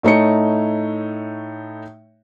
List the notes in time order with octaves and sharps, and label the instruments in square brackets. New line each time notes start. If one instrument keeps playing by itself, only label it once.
[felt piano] A2 A3 D#4 C#5 C#7